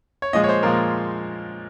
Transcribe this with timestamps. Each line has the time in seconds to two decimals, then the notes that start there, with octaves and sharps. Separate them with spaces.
0.22 C#5
0.33 A#2 F3 G#3 D#5
0.44 C#5
0.49 C5
0.63 A#2 F3 G#3 A#4